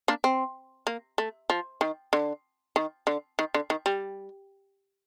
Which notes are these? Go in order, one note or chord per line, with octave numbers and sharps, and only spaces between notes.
A#3 D4
C4
A#3
A3
F3
D#3
D3
D#3
D3
D#3
D3
D#3
G3